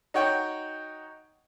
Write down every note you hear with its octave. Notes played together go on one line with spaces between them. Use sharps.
D#4 F#4 C#5 G5